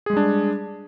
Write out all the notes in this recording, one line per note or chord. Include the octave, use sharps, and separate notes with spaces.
G3 G#3 D4 G#4